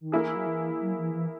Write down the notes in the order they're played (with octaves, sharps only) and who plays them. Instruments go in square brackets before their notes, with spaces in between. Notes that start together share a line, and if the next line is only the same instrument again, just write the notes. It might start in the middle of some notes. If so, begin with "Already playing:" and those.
[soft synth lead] D#3
[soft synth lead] E3 [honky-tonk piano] A#3 E4 G#4
[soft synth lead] F#3
E3
F#3
E3
E3